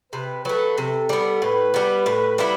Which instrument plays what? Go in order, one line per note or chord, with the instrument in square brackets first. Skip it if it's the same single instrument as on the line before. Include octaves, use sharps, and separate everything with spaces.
[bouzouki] C3 [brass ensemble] B4
[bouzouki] F#3 A3 [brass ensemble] B4
[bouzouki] C3 [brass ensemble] A4
[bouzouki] G3 B3
[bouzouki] A2 [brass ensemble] B4
[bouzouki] G3 B3
A2
G3 B3 E4